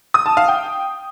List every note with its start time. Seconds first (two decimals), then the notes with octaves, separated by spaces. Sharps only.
0.14 D#6
0.26 A5
0.37 F5
0.48 G5